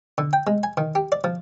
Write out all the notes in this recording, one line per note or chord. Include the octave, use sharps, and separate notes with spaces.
D3
G5
G#3
G#5
D#3
G4
D5
F3